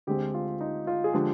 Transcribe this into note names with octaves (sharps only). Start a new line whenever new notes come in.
D2 D3 G#3 C4 G4
F4
D#4
F4
G#4
D3 F3 G#3 G4